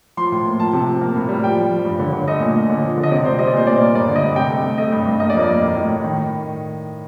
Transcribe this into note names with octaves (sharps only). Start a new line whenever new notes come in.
F3 C6
A2
A#3
F3 A5
C3
F3
A#3
A2
G3
F3 G5
F3
F3
G2
D3
D3
A3 D#5
A#2
A#2
D3
F3
D3
D#5
C3 D5
C3 C5
G3 D#5
D5
A#2 C5
A#2 D5
A#3
G2 D5
D3
D#5
G2
C3 G5
A3
C3
A3 D#5
G2
G2
A#3 D#5
D5
F2
D#5
A#3
A2
A2
A2
D#3